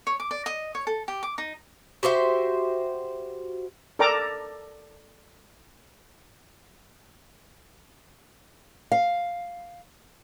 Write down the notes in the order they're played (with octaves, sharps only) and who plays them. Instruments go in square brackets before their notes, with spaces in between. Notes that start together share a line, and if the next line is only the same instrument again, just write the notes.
[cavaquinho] C#5
D6
D5
D#5
C#5
A4
G4
D6
D#4
[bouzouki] F#4 G4 C5 E5
[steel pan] A4 A#4 D5 G5 A#5 D6
[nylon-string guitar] F5